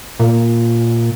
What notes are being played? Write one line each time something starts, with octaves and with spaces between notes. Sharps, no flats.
A#2